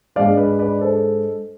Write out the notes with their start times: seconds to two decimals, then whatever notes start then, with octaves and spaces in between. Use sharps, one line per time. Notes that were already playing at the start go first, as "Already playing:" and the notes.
0.16 G#2 G#3 D4 D5 F5
0.37 B4 D5
0.59 B4 D5
0.81 A4 C5